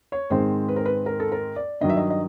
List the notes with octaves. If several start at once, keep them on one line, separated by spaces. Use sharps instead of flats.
C#5
G#2 D#3 G#3 C4 C5
B4
A#4
B4
A#4
A4
A#4
D5
G2 D#3 F#3 D#5
E5
D#5
D#5